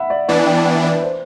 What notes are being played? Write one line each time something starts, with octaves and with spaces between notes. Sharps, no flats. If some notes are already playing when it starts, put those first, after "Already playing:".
Already playing: E5 F#5 B5
D5
E3 B3 D4 D5
G5
A5
G5
E5
D5
B4
C5